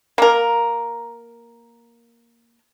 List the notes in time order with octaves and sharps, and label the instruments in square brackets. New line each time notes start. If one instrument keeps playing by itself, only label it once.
[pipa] A#3 A#4